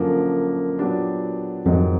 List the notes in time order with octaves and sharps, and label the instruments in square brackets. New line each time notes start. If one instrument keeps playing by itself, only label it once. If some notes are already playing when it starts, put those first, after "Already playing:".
Already playing: [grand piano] F#2 D3 F3 A#3
A#2 F#3 B3 D4 G4
[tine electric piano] F2 [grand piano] G#2 D#3 F#3